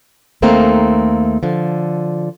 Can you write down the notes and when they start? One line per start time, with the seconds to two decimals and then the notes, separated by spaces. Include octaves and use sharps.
0.42 D#2 A3 A#3 C4 D#4
1.43 D3 F3